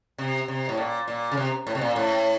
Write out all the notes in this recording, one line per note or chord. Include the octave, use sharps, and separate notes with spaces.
C3
C3
A2
A#2
A#2
C#3
C3
A2
C3
A#2
A2